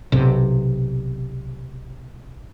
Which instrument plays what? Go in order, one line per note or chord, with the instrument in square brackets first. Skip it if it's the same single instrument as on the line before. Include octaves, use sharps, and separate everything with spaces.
[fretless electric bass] B1 C3